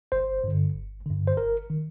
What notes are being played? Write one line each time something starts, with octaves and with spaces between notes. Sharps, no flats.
G1 C5
G2 D3
G1
G2 D3
C5
G1 A#4
D#3